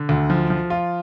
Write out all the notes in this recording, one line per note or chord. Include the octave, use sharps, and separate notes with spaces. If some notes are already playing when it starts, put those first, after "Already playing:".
Already playing: D3
D2
F3
F3
F4